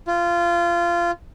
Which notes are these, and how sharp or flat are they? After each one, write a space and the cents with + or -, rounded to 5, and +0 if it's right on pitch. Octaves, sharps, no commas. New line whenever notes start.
F4 -20